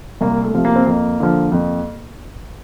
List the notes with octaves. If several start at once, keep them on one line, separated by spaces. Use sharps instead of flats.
C2 A#3
A3
C3 F3
A#3
C4
F2 A#3
D3 F3
F2